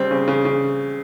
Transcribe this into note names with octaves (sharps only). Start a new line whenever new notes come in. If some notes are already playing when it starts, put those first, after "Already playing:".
Already playing: D#2 C#3 G3 C4
C#3
C#3
C#3